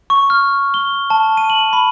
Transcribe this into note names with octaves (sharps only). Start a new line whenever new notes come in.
C#6
F6
G7
A5
D#7
F#7
B5